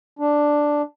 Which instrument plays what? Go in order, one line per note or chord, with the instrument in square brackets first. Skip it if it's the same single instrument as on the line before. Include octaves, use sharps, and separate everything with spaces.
[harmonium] D4